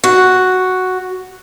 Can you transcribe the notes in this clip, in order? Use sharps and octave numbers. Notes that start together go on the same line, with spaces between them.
F#4